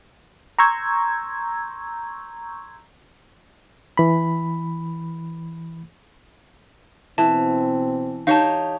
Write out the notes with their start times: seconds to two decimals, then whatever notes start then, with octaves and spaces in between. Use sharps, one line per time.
0.59 A#5 C6 C#6 E6 G6 G#6
3.97 E3 B5
7.18 B2 E3 C4 A5
8.27 D#4 G4 C#5 F5 A5